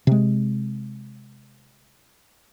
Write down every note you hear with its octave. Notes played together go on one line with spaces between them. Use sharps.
C3 G#3